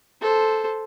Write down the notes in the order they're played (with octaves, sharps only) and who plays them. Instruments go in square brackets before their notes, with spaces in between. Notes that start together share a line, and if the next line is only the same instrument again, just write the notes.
[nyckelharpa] A4 C5